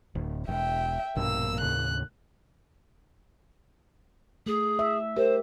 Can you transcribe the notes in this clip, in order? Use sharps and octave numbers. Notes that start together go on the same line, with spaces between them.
D1
E1 E5 G5
A#1 G2 B2 A#3 E6
D#2 A2 C#3 F#6
A3 G#4
E5
G4 A#4 C5